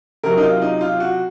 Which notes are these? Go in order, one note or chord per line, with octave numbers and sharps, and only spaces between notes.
C3 F#3 A#4
D#4
F4
D#4
F4
F#4